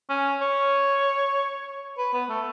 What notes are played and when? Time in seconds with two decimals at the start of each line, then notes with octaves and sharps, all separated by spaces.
0.10 C#4
0.41 C#5
1.98 B4
2.13 B3
2.29 A3